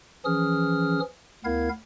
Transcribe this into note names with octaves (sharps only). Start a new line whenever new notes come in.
E3 F3 C#4 G#4 D#6 F6
D2 B3 E4 A#4 F5 G#6